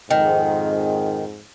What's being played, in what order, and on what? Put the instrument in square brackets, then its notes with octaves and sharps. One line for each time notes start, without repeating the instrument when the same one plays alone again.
[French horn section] F2 G#2 [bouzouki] D#3